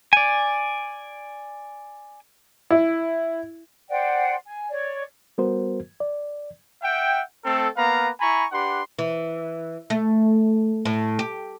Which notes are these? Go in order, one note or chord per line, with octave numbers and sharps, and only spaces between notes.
D5 G#5
E4
C5 D5 F#5 G5
G#5
C#5 D5
G3 B3 F#4 A#4 C5
D5
E5 F#5 G5
A3 C4 A4
A#3 B3 B4 F5 A#5
E4 G#5 A#5 B5 C#6
D4 G4 B4 F#5 C6
E3
A3
A2
G4